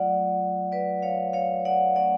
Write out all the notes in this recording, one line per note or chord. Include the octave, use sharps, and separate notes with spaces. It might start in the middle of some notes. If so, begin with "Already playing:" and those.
Already playing: F#3 A3 F4 D5 F#5
B4 D5
C#5 F5
C#5 F5
D5 F#5
F#3 A3 C#4 D5 F#5